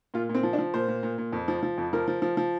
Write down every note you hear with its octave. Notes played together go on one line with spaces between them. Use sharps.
A#2 F4
A#2
C4
F3
D4
F3
A#2 C5
A#2
A#2
A#2
F2
F3
F3
F2
F3 A#4
F3
F3
F3